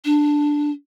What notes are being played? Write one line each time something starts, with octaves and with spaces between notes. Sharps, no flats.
D4